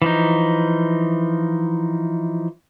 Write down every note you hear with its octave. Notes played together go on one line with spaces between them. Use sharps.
E3 F3 D#4